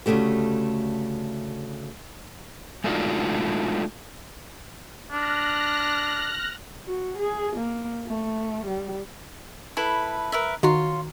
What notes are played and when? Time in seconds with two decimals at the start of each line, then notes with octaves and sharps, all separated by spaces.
0.06 D2 G#2 C#3 A3 G4
2.84 G#3 A3 D4 D#4 F4 F#4
5.12 D4 F6 F#6 A#6
6.86 F#4
7.18 G#4
7.56 A#3
8.07 A3
8.66 G3
9.77 E4 A4 B4
10.32 A#4 B4 E5
10.63 D#3 F4 F#4 C#5 A#5 C6